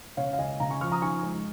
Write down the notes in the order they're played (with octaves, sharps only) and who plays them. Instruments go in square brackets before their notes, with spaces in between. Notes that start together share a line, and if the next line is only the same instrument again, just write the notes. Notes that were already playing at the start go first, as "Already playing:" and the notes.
[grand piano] C#3 C#5 F5
F5
C#2 D#5 G#5
C#3 F5 A#5
G#5 C#6
F3 C#6 F6
A#5 D#6
D#3 G#5 C#6
G#3